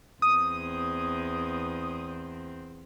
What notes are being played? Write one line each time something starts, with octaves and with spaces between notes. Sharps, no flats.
E2 C4 D#6